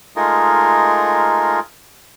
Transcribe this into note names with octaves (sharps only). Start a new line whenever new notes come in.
G#3 A3 D#4 F4 G#4 A#4